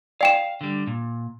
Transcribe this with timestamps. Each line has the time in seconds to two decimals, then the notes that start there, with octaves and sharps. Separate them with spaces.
0.21 D5 F5 G5 E7
0.61 D3 G3
0.87 A#2